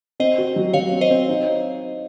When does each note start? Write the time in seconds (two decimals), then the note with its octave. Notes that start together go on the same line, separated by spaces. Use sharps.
0.20 C4 C5 D#5
0.38 F#4
0.56 F#3
0.73 F#3 C#5 F5
0.92 C4
1.01 C5 D#5
1.10 C4
1.29 D#4